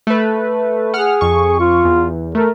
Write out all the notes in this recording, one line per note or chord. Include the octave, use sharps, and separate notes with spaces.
A3 B4
G#4 F#5 F6
F2 C#6
F4
E2
A3 A#4